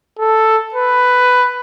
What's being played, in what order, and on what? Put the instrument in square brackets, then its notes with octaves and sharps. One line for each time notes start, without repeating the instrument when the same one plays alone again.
[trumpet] A4
B4